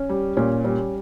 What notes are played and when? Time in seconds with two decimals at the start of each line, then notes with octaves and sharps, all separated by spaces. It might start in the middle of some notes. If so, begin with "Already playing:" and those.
Already playing: C#4
0.09 G3
0.37 A#2 C#4
0.64 G3 C#4